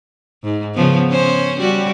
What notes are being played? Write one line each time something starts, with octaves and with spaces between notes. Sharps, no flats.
G#2
C#3 F3 B3
C#4 C5
G3 F#4